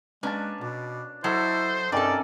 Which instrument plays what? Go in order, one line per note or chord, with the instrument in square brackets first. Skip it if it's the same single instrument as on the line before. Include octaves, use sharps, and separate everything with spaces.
[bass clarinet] G#3 [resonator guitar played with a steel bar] A#3 C#4 B4 [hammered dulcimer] D4 A5
[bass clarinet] B2 [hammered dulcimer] D6
[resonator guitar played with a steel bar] F#3 [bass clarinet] E4 [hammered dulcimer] A4 D#5 [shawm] C5
[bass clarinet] G2 [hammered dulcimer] C3 D#3 C#4 [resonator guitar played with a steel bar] D#4 A4 [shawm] D5